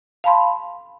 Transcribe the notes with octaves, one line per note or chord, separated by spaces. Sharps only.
F5 A5 B5 C6